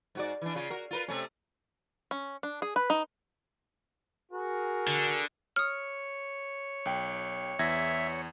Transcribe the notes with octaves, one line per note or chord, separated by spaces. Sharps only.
G#2 F#4 D5
E3 D4
C#3 F4
F#4 A#4
F4 A#4 B4
C3 A3 C#4
C#4
D4
G#4
B4
D#4
F#4 G#4 A#4
D3
C#5 D#6 F6
B1 G5
E2 E5 G#6 A#6